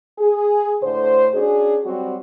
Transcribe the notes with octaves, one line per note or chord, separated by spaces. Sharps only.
G#4
A2 D3 C5
C#4 D4 F#4 G#4
F#3 G3 C4 F#4